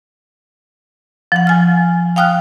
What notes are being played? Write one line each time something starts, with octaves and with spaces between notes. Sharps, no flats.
F3 F#5
F3 G#5 F6
F5 G5 D#6 F6 F#6